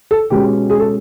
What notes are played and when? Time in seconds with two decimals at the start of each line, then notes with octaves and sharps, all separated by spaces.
0.11 A4
0.30 B2 G#3 C#4 G4
0.70 G#4
0.79 A4